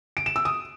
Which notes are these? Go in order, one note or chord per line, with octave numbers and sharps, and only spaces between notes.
D7
E7
E6
D#6